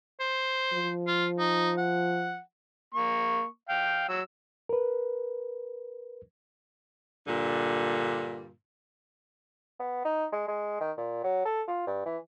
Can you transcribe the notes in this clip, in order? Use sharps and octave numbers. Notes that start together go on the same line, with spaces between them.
C5
F3
F4
D#4
F#5
A#3 C#6
F5 G5
F#3 E6
A#4 B4
G2 A#2 D3
B3
D#4
G#3
G#3
D#3
A#2
F#3
A4
F4
G2
E3